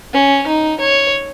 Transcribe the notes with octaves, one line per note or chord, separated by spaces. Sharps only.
C#4
D#4
C#5